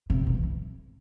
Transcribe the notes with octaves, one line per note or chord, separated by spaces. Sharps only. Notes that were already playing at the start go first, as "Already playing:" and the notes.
C3
C3
E3